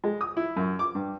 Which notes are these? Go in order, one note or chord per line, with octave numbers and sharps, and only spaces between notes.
G#3
D#6
E4
F#2
D6
G2